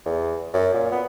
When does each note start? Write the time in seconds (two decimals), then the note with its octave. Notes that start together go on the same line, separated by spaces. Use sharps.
0.05 E2
0.53 F#2
0.74 A#2
0.91 B3